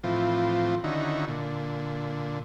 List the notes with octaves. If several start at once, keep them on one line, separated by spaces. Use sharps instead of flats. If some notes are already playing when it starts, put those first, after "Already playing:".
A2 E3 F3 C4 F4
D3 D#3 C#4 D#4 E4 F#4
A#2 D3